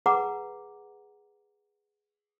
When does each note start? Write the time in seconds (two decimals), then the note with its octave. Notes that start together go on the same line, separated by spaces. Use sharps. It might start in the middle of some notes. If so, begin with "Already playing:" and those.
0.06 G#4 B4 F#5 A#5 D6